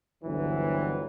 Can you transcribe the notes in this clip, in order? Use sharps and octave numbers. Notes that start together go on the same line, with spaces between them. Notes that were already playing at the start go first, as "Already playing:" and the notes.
G1 D2 E3 F#3 C4